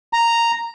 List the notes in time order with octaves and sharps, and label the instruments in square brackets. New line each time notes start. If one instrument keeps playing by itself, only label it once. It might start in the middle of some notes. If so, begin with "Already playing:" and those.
[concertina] A#5